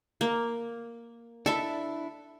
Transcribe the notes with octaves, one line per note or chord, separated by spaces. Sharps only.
A#3
D4 E4 A4 E5